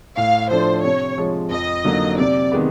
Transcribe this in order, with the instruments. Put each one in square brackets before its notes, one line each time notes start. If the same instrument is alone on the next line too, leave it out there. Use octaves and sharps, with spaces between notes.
[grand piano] A2 [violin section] F5
[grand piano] F3 A3 D4 [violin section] C5
[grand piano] C3 [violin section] C#5
[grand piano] F3 G#3
[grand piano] F2 [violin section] D#5
[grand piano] D3 F#3 A#3 D#4
[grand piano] C3 [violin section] D5
[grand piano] D#3 G#3 B3